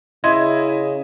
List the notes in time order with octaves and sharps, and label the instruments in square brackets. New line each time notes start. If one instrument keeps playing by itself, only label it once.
[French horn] C#3 [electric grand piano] E4 E5 [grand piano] D#5 [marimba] C6 G#6